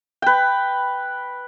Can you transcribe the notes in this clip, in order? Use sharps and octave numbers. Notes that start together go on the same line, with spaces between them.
B4 G5